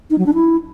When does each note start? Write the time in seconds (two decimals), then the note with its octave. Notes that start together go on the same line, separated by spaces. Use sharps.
0.10 D#4
0.18 F#3
0.26 D4
0.34 E4